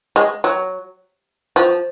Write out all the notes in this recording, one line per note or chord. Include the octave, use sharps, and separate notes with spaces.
G#3
F#3
F3